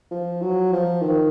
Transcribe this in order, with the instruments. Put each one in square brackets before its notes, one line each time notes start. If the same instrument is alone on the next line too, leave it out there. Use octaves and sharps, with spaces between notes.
[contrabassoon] F3
F#3
F3
D#3